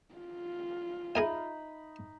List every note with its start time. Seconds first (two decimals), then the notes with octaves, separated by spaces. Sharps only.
0.15 F4
1.15 D#4 G#4 A#4 E5 G#5 B5